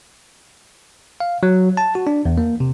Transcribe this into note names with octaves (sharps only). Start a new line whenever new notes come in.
F5
F#3
A5
F#4
D4
E2
A#3
C3